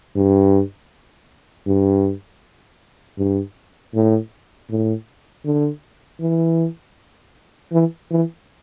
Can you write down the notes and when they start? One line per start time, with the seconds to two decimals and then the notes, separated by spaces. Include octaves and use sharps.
0.16 G2
1.67 G2
3.18 G2
3.94 A2
4.70 A2
5.45 D3
6.21 E3
7.72 E3
8.11 E3